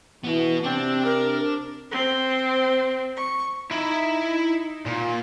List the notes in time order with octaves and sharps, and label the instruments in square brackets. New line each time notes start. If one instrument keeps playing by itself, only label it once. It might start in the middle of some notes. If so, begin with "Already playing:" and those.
[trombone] E3 [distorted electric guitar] B3 F#4
[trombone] C3 [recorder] C4 [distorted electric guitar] D4
[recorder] A#4
[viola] C4
C#6
[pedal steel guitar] D#4 [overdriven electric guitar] E4 E5
[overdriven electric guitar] A#2